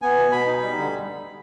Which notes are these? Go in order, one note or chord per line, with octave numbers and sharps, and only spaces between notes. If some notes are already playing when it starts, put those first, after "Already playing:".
B3 G#5
B2
B2 B5
D#4
G3
D3